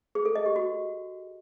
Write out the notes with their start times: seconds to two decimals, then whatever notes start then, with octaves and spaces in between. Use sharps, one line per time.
0.15 G#4
0.25 A4
0.36 D#5
0.46 G4
0.56 F#4